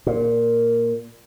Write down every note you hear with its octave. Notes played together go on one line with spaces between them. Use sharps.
A#2